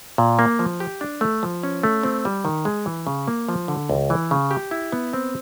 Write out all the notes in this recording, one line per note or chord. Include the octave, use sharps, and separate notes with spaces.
A#2
A#3
F3
G4
D4
A3
F3
C#4
A3
C4
G3
D#3
G#3
E3
C#3
A#3
F3
D3
C#2
E3
C#3
G4
E4
B3
C4